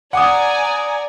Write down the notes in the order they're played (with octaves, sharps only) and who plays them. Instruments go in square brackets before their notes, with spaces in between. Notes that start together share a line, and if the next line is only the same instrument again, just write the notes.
[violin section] D5 G#5 A#5 [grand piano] F#5 D6 D#6